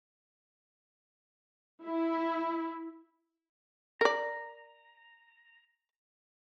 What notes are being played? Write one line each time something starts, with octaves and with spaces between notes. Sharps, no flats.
E4
A#4 D5 A#5